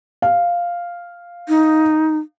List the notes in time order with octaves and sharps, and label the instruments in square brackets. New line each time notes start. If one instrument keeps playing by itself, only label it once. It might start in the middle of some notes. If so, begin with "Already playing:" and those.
[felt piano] F5
[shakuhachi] D#4